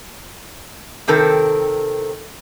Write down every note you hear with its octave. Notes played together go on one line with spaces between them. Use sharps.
C3 D#3 C4 A4 A#4